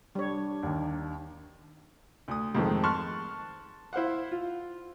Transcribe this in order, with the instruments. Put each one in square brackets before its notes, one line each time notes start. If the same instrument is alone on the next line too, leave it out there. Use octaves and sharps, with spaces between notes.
[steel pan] G3 C#5 [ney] D4
[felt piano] D#2 D#3
[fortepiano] D2 D#6
F2 G#2 D#3 G#3 A3 C4
A5 C6 C#6 F6 F#6
E4 C5 F5 F#5
F4